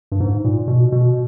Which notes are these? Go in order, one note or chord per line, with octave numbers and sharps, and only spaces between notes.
G2
G#2
A#2
B2
B2